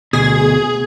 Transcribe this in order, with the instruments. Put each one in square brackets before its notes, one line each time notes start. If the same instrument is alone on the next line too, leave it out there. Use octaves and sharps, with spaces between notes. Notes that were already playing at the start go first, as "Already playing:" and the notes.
[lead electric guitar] D2 B2 [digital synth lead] G#4